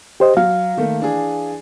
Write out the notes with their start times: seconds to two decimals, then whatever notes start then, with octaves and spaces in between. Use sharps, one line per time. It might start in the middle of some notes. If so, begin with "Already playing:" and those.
0.20 G4 C5 D#5
0.37 F#3 F5
0.77 D#3 A3 A#3
1.00 E3 D4 G#4